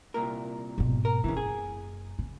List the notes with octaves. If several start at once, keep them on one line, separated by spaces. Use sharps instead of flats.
C2 A#2 A#4
G#2 B2
A#4
F#1 C#3 E3
G#4
C#3